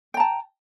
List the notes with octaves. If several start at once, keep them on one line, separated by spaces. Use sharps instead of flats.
G5 A5 A#5